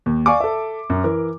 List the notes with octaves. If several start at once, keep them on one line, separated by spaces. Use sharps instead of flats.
D#2
D5 F5 G#5 C#6 D6
A4 E5
F#2
E3 A#4